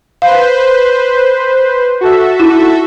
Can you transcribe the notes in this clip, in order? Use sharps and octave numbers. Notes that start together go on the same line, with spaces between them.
B4 C5 F5
F#4 A4 E5
D#4 E4